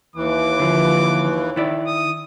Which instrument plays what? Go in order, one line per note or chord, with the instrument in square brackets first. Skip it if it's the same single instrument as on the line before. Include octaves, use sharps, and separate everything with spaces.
[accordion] D#2 E3 [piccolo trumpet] D6
[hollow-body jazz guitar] D3 F3
D#3 E4 D5
[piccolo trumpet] D#6